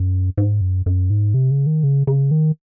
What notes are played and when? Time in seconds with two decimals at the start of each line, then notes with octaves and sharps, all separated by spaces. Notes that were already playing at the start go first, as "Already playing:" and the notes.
Already playing: F#2
0.37 G#2
0.61 F#2
0.86 F#2
1.10 G#2
1.34 C3
1.50 C#3
1.66 D#3
1.83 C#3
2.07 C#3
2.31 D#3